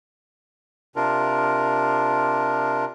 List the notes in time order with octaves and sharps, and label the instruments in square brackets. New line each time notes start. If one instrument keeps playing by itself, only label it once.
[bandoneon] C3 D4 F4 A#4